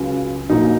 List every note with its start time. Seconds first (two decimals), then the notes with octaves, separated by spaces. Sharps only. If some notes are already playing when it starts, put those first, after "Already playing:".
Already playing: C#2 C#3 F#3
0.50 A#1 A#2 F#3 D#4